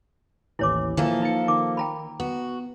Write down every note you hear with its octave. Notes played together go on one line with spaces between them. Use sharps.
A1 D#2 E3 E4 C#5 D6
E3 F3 A#3 A4
D#4 A#5 C#7
D#3 D6
G5 A#5 B5
B3 F#4